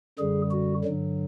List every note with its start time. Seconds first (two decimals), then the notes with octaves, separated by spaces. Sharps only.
0.18 F#2 D3 G3 G#4
0.51 F#4
0.84 G2 D3 F#3